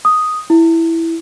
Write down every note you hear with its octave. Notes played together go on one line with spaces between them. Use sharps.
D#6
E4